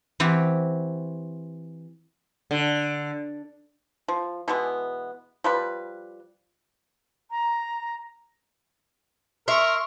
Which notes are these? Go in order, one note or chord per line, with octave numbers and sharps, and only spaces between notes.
E3 C4 F#4 G4
D3
F3
B2 E3 G#3 B3
F3 G3 B4
A#5
A#4 E5 C6 C#6